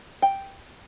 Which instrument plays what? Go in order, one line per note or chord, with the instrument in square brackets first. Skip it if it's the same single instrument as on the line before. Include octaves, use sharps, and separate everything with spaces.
[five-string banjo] G5